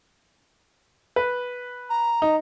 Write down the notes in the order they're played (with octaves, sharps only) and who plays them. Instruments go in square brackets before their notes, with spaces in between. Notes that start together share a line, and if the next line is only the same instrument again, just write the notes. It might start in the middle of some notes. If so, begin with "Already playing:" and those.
[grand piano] B4
[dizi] A#5
[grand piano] D#4